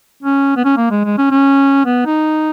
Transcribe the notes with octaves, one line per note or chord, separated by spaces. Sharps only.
C#4
B3
C#4
A#3
G#3
G#3
C#4
C#4
B3
D#4